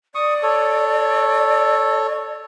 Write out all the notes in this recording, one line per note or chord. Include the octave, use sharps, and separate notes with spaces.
D5 C#6 D#6
A4 C#5